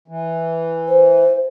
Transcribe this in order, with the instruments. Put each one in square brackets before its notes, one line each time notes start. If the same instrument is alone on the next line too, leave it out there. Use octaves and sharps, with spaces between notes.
[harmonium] E3
[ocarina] C5